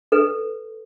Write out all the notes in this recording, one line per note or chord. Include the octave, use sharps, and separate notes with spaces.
A4 B4